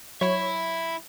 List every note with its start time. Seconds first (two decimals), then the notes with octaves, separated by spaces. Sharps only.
0.21 F#3 E4 C#5 E5